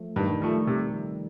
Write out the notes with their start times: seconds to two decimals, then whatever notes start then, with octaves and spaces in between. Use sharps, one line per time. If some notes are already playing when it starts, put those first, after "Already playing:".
Already playing: F3 A3
0.16 G2 D#3 G3
0.42 F3 A3
0.67 C3